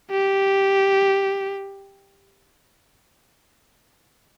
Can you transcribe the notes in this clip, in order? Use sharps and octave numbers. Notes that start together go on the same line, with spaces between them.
G4